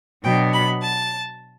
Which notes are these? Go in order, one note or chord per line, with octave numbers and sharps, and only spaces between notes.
B2 F#3 B3 D4 G5
B5
A5